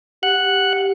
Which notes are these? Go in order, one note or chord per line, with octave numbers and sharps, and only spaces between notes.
G4 F#5 F#6